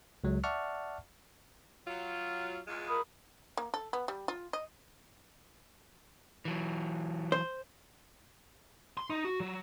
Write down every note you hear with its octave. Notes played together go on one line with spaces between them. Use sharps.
C#2 F#3 G#3
D5 E5 F#5 A5 C#6 F6
F#3 F4
E2 G#3 F4
A#4 B5 D#6
A#3
A4
B3
G3
F4
D#5
E3 F#3
C5
C6
D#4
F#4
F#3